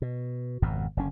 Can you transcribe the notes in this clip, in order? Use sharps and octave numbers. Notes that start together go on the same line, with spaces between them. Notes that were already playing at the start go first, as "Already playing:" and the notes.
B2
G#1 F2 B2
F#1 D3 C#4